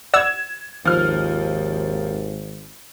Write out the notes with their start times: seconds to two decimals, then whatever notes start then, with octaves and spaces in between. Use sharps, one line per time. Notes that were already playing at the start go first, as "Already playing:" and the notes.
0.14 D5 F#5 E6 G#6 E7
0.85 G#1 D#2 F3 F6